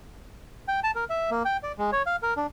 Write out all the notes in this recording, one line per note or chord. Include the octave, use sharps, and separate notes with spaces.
G5
A5
A#4
E5
A#3
G5
D5
G#3
C#5
F5
A#4
D4